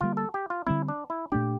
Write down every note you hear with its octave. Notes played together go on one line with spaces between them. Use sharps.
D3 G3 A#3 F4
A4
G4
F4
D3 G3 C4 E4
D4
E4
A#2 A3 D4 G4